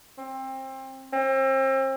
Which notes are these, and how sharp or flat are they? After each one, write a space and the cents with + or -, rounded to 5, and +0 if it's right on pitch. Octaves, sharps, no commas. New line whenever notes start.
C4 +25
C4 +35